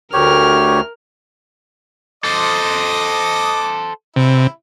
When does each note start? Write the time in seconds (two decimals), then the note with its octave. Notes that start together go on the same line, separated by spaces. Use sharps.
0.13 D2 G4 A#4 C#5 F6
2.24 A4 C5 D#5 D6 D#6
4.16 C3 E4